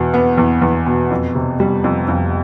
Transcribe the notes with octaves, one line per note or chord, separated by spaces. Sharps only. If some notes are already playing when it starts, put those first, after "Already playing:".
Already playing: E2 B2
B3
E2
E2
B2
F2
C3
G3
F2
F2